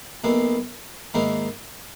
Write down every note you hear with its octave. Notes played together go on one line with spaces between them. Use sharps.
B1 B2 A#3 E4
G#2 D#3 A#3 E4 A#4